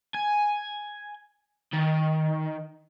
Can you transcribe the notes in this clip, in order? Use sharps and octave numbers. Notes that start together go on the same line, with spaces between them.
G#5
D#3